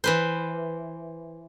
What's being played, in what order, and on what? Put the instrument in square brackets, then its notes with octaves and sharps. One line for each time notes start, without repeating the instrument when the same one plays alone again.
[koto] E3 B4 C5